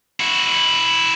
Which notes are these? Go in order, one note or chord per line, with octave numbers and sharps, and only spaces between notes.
E4 F#4